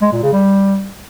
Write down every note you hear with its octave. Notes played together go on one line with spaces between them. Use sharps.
G#3
A#2
C#3
G3